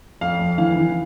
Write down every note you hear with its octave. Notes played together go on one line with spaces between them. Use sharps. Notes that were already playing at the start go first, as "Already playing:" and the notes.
F2 F5
F2
E3 F5
E3